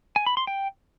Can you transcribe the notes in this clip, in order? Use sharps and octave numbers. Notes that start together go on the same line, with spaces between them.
G#5
B5
C6
G5